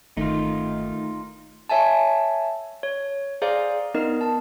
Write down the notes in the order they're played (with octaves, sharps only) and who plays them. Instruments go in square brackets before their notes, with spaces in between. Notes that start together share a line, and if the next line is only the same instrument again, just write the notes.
[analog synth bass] G1 [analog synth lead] D#3 [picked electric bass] A3 [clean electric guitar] D#4 F4
[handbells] C#5 E5 G#5 A5
C#5
G#4 C5 D5 F5 A#5
B3 D#4 A#4 D#5
A5